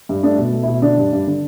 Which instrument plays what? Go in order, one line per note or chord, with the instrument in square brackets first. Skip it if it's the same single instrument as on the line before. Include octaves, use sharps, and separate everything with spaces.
[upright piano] G2
A3 D4
B2
A3
B2 E4
D3 D4
G2
G2
D3